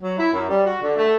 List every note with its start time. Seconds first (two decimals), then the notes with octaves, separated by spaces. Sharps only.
0.01 F#3
0.17 E4
0.33 F#2
0.48 G3
0.65 F#4
0.81 D3
0.97 A3